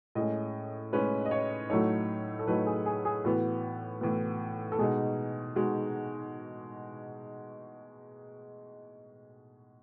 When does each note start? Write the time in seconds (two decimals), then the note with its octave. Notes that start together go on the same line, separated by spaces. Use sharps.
0.15 A2 G#3 C#4 D#5
0.93 A2 G#3 C#4 B4
1.25 D#5
1.31 C#5
1.70 A2 F#3 A3 D#4 C#5
2.39 A4
2.47 A2 F#3 A3 D#4 B4
2.66 G#4
2.86 G#4
3.05 G#4
3.25 A2 E3 B3 F#4
4.01 A2 E3 B3
4.72 A4
4.78 B2 G#3 D#4 G#4
5.56 B2 G#3 D#4 F#4